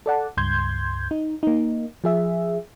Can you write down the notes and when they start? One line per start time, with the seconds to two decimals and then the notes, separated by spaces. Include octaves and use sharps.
0.06 A4 D5 F#5 A5
0.37 C#2 G2 C6 G6 G#6
1.11 D#4
1.43 A#3 D#4
2.04 F3 G#4 E5